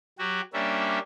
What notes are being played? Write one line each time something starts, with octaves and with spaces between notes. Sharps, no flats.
F#3 F#4 G4
G3 A#3 C#4 D4 E5